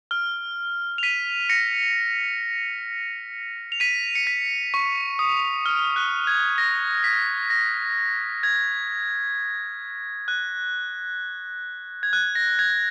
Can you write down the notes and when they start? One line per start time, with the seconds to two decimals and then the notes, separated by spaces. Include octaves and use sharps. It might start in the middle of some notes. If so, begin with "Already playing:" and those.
0.11 F6
0.98 F7
1.03 B6 D#7
1.49 A#6 C#7
3.72 F7
3.80 B6 D#7
4.15 C#7
4.27 B6
4.74 C#6
5.19 D#6
5.66 F6
5.96 F#6
6.27 G#6
6.58 A#6
7.04 B6
7.50 A#6
8.43 G#6
10.28 F#6
12.03 G#6
12.13 F#6
12.35 A#6
12.59 G#6